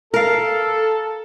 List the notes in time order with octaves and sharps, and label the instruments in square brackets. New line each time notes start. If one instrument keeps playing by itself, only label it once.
[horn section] A4 [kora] A#4 F5